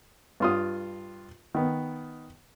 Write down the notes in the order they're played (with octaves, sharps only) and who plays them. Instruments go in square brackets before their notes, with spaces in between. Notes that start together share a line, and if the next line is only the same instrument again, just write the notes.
[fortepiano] G2 F4 D#6
D#3 B3